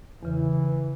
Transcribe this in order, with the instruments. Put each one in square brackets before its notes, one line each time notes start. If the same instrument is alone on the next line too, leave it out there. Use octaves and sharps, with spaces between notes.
[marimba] E2 C#3 [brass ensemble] E3